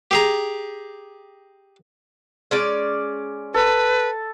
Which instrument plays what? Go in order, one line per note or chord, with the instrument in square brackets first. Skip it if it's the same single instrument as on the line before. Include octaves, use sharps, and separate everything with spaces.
[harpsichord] G4 G#4 A#5
[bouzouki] G#3 C#4 D5
[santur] A4 [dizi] B4